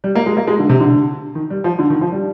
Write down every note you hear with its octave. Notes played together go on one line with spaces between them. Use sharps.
G3
A#3
G#3
A#3
G#3
D3
C3
D3
D#3
G3
F3
D3
D#3
F3
G3